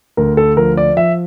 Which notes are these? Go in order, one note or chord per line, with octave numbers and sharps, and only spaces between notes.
D2 A#4
A4
F3 A#4
D5
F3 E5